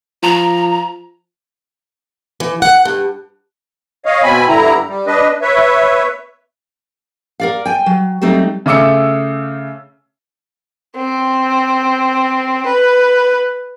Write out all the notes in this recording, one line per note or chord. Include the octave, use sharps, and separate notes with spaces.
F3 A#5
E3
F#5
G2
C#5 D#5 F5
B2 C4 G#5 B5
G2 D3 E4 A#5
G3
D4 B4 D#5
B4 C#5 E5
A#4 D5 F5
G5 G#5
F#3
F#3 G3 A3 C4 D#4
C#3 A3 D6 E6 C#7
C4
B4